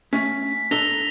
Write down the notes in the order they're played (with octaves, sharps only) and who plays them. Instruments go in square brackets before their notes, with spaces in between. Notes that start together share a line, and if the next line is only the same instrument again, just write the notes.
[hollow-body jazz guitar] A3 C#4 [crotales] B6
[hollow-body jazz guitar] D4 A4 A#5 [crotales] A#6 F7 G7